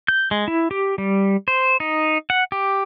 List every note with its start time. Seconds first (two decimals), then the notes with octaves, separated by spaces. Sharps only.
0.08 G6
0.31 G#3
0.48 E4
0.71 G4
0.98 G3
1.48 C5
1.80 D#4
2.30 F#5
2.52 G4